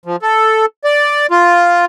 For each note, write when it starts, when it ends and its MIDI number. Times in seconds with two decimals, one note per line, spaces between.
0.06 0.16 53
0.22 0.66 69
0.84 1.27 74
1.31 1.85 65